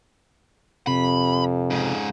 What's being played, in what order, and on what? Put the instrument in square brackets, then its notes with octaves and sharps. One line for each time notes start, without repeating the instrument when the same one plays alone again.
[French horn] F2 [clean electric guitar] C3 [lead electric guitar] B5
[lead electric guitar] G#2 C#3